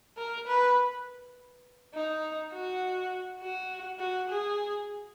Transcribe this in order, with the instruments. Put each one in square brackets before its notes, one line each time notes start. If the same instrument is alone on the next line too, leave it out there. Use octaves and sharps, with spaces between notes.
[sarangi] A#4
B4
D#4
F#4
F#4
F#4
G#4